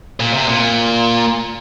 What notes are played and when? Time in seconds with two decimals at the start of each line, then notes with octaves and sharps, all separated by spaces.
0.20 A#2
0.34 C3
0.48 A#2